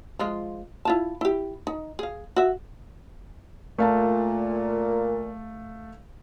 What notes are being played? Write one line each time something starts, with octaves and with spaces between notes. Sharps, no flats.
F3 G#3 F4
E4 F4 A5
E4 G4
D#4
G#4 F5
F#4 E5
A#2 A3 F5 A5